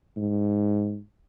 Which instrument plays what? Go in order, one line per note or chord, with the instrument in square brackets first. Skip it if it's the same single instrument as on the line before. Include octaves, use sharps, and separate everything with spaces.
[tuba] G#2